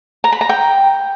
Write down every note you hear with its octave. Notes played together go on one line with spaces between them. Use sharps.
A#5
B5
A#5
G5